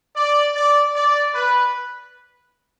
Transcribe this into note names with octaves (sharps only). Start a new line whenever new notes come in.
D5
D5
D5
B4